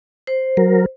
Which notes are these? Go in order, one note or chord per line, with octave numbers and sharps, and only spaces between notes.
C5
F#3 A#4